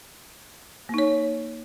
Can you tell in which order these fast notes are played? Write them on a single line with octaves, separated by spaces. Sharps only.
A#3 D#4 C#5